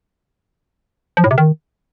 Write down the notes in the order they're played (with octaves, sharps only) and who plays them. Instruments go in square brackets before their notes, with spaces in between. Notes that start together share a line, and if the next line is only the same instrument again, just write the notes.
[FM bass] F3
A2
C3
D#3